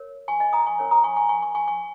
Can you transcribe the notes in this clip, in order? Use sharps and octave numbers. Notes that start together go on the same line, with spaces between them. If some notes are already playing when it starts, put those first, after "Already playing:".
Already playing: A#4 C#5
G#5 C#6
D#5 G#5
A#5 D#6
G#5 C#6
C#4 A#4 C#5
A#5 D#6
G#5 C#6
G#5 C#6
G#5 C#6
G#5 C#6
G#5 C#6
G#5 C#6